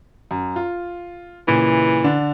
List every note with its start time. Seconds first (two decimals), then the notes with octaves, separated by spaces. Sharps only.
0.31 F#2
0.56 F4
1.48 A#2 C#3 E3
2.04 D3 D4